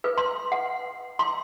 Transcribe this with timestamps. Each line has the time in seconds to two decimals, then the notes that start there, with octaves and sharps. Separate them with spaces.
0.04 B4
0.18 C6
0.52 F#5
1.19 C6